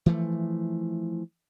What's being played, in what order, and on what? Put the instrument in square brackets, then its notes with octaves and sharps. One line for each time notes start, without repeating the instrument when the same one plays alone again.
[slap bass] E3 F3 A3